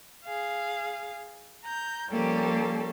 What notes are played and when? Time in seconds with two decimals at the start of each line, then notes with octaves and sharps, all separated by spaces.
0.24 G#4 F5
1.64 A#5 G6
2.10 F3 G3 A#3 C#4 G4 A4